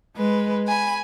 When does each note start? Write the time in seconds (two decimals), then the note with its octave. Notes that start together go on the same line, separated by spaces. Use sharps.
0.17 G#3 B4
0.67 G#5 B5